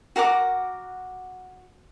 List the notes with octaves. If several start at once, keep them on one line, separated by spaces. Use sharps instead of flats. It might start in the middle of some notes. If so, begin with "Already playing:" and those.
F#4 A#4 F#5 D6